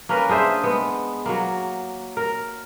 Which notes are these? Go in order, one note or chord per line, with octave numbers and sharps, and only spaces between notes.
A#3 C#4 A#4 B4
D4 G#4 C5 E5
G#3 B3
F#3 A#3
A#4